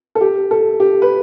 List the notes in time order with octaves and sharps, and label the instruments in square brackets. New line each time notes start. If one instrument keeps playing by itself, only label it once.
[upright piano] A4
G4
A4
G4
B4